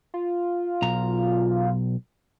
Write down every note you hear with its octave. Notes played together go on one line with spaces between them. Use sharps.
F4
B1 A#5